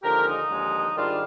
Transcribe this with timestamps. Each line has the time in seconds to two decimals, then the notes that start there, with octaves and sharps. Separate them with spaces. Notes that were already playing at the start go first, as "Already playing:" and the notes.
0.03 D#2 D3 F3 G#3 G4 A#4
0.27 D#4
0.50 D#2 D3 F3 G#3
0.96 G#2 D#3 G3 D4 F4